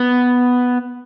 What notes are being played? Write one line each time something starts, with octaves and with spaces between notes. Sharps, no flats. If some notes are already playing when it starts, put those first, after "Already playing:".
Already playing: B3